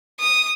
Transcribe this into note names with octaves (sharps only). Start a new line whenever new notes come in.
D#6